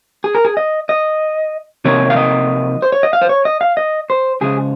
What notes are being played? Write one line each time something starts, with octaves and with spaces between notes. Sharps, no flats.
G#4
A#4
G#4
D#5
D#5
C3 F3 A#3 D#4 C#5
F5
D#5
C5
C#5
D#5
F5
C5
C#5
D#5
F5
D#5
C5
C#2 C#3 F3 G#3 G#4